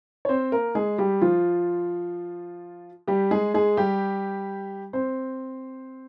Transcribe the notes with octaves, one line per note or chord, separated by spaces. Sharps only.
C#5
C4 C5
A#3 A#4
G#3 G#4
G3 G4
F3 F4
G3 G4
G#3 G#4
G#3 G#4
G3 G4
C4 C5